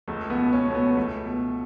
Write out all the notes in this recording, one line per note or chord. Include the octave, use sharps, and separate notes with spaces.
C#2 A3
B3
B2
C#4
B2 A3
B3
C#2 A3
B2